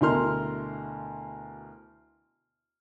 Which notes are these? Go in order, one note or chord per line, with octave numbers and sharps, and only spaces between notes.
D2 B2 E4 A#4 C6 F6